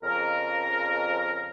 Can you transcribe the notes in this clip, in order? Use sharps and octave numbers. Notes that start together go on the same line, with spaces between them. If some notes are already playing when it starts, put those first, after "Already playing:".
F2 C#3 A#4